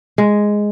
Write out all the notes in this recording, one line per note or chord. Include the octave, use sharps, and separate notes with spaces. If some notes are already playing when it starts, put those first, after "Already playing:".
G#3